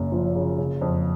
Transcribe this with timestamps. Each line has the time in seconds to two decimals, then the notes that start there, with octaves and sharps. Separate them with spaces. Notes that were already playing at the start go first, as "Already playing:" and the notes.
Already playing: F#1 F#2
0.12 F3
0.35 C#3
0.58 C#3
0.81 F2